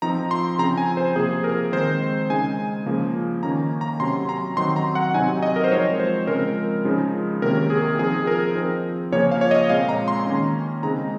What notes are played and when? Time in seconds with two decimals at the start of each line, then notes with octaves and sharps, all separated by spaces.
0.02 F3 C4 D#4 A#5
0.31 C6
0.58 C#3 F3 C4 A#5
0.78 G#5
0.97 C5
1.16 C3 F3 A#3 G#4
1.44 A#4
1.72 D#3 G#3 C4 D#4 C5
2.30 C#3 G#3 D#4 G#5
2.86 C#3 F3 A#3
3.43 D#3 A#3 C#4 A#5
3.81 A#5
4.00 C3 F#3 C#4 C6
4.29 A#5
4.57 D#3 F#3 C4 D#4 C6
4.76 A#5
4.95 F#5
5.14 C3 F#3 C4 D#4 G#5
5.43 D#5
5.56 A#4
5.64 C5
5.71 F3 G#3 C4 D#4 C#5
6.00 C5
6.27 C#3 F3 G#3 C4 A#4
6.85 C#3 F3 G#3 D#4
7.42 C3 D#3 A#3 C#4 A#4
7.70 G#4
7.99 F3 C4 D#4 G#4
8.27 A#4
8.55 F3 C4 D#4
9.12 C#3 F3 A#3 C#4 C#5
9.31 F5
9.41 C#5
9.51 D#5
9.69 A#2 G#3 C4 F5
9.89 A#5
10.08 C6
10.26 D#3 A#3 C#4 A#5
10.83 C#3 G#3 C4 D#4 A#5